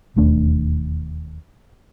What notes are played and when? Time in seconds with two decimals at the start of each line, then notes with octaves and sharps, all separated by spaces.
0.16 E1 D#2 A3 D4